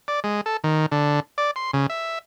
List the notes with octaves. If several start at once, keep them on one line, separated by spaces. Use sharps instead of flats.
D5
G#3
A4
D#3
D3
D5
C6
C#3
E5